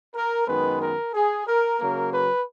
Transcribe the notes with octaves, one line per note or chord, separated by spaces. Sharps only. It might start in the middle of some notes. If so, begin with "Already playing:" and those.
A#4
F#2 D#3 G#3 B3 B4
A#4
G#4
A#4
C#3 F#3 A#3 A#4
B4